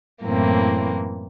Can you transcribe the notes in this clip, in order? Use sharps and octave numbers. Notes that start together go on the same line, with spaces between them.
F#2 A2 E3 A#3 C4